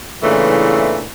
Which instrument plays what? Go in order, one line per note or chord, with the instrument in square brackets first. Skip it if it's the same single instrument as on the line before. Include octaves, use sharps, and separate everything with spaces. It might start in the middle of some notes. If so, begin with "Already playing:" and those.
[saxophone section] E2 A#2 C#3 E3 A3 D4